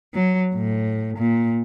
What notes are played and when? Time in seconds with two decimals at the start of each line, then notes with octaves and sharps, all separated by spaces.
0.14 F#3
0.54 A2
1.17 A#2